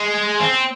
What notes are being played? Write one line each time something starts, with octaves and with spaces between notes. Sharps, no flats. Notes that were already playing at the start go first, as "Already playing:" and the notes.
Already playing: G#3
C4